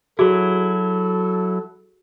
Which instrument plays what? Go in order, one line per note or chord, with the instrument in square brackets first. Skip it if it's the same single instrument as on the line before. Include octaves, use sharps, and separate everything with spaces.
[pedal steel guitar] F#3 E4 [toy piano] F#4 G#4 [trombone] A4